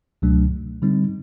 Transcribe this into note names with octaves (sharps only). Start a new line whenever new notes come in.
C#2 B2 F#3 A3 D4
D3 G3 C4 D#4